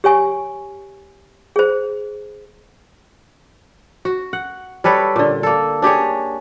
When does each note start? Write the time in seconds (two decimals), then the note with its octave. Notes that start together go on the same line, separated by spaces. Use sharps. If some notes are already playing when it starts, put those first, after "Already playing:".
0.04 G4 C#5 G#5 C#6
1.56 G#4 C5
4.05 F#4
4.33 F#5
4.84 G3 A4 B4 C#5
5.16 A#2 D3
5.43 A#3 A4
5.82 D4 G4 G#4 C#5